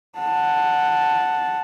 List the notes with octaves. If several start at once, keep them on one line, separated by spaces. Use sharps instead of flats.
F#5 A5